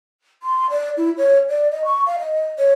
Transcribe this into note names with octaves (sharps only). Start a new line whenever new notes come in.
C6
D5
E4
C#5
D5
D#5
C#6
F5
D#5
C#5